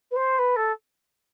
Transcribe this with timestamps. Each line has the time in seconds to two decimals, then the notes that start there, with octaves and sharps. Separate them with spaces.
0.11 B4
0.16 C5
0.38 B4
0.56 A4